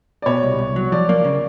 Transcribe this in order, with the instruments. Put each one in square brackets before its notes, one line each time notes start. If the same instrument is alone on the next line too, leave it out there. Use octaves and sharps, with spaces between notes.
[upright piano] D5
[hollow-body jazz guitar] B2 [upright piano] C#5
[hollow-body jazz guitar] C2
C2
F#3
[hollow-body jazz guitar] F3 [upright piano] D5
[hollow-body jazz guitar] A#3
C#3